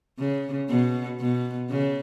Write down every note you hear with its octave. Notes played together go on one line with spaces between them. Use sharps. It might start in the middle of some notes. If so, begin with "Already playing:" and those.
C#3
B2
B2
C#3